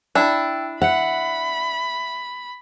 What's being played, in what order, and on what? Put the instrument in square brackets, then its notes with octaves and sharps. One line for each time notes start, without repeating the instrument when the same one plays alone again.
[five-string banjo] D4 E4 [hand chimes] G5 A5 E6
[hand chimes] E5 C#7 [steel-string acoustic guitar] F#5 [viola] B5